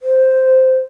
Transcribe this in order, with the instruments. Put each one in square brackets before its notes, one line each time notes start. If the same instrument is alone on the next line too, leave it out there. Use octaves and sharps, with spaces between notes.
[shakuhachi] C5